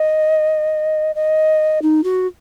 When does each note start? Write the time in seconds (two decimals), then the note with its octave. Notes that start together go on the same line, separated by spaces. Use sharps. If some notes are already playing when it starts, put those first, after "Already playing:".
Already playing: D#5
1.15 D#5
1.82 D#4
2.04 F#4